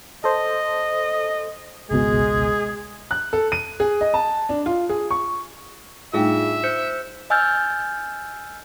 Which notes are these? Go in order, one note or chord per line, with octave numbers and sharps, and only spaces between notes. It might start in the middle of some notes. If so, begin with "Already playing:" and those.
A4 C5 D#5
G#1 C#2 B2 G#3 G#4
F#6
A4
D#7
G#4
D#5
A5
D4
F4
G#4
C#6
A2 G3 D4 D#4 F4 G#4 E5 G5
C5 G6 C#7
D#5 G#5 E6 F6 G6 A6